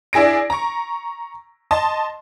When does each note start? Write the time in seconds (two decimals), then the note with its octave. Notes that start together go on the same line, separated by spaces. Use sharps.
0.13 D4 E4 G#4 A#6 D7
0.50 A#5 C#6
1.71 D#5 A5 C6